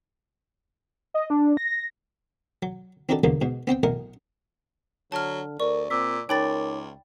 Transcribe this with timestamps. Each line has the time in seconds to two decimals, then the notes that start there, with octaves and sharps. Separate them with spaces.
1.14 D#5
1.30 D4
1.57 A#6
2.63 F#3
3.09 C4 D4 D#4 F#4 G4 A4
3.24 E2 G#2 D3 F#3 A#3 B3
3.41 G#2 B2
3.67 B3 C4 C5 G5
3.83 B1 A2 A#4 D#5 F#5
5.12 D3 F#3 A5 F6
5.60 D2 A#4 D5 C#6
5.90 A#2 C4 D6 E6 B6
6.29 C#2 D#4 A#4 C#5 G5 B5 D6 A6